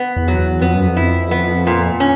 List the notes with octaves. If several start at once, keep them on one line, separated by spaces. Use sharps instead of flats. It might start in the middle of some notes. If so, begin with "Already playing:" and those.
Already playing: B3
E2
F#3
E2
F2 B3
F#2
F2
E4
B3
A#2
C#4